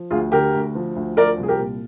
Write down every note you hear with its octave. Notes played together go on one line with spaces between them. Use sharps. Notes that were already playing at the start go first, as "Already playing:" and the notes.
Already playing: F3
D2 F4 G#4
D3 G4 A#4
D2
F3
D2
F3 A#4 D5
C2
G#4
G4 A#4
A#2